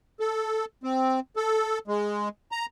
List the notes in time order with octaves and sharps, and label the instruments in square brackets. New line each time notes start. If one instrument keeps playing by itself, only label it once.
[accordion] A4
C4
A4
G#3
A#5